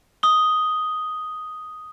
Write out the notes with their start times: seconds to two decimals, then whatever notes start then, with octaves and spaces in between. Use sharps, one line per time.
0.23 D#6 G7